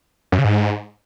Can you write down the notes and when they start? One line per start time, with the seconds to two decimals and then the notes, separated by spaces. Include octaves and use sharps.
0.32 F#2
0.38 C#3
0.45 G#2